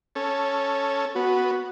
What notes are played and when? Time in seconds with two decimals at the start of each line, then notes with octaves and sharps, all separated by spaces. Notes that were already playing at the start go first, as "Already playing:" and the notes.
0.15 C#4 A4
1.15 B3 F#4